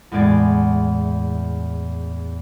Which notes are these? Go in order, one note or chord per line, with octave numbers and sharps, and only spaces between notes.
E2 A2 G#3 D5 G#6 D7